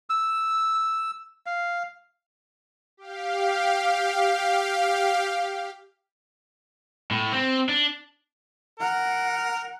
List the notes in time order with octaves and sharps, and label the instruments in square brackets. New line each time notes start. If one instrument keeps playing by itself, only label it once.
[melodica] E6
F5
[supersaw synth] G4 F5
[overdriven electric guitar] A2
C4
D4
[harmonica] A#4 [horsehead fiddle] F#5